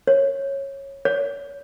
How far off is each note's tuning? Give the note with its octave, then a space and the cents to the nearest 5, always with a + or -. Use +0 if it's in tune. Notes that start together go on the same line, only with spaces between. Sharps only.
C#5 -15
C#5 +30